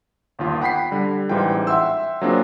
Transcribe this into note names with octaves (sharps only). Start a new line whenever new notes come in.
G1 D#2 F4
F#5 G5 B5 B6 C7
D3 G3
A1 G#2 E3 G3 F4 G5
E5 F#5 G5 C6 E6
F#3 A#3 C4 D4 F4 G#4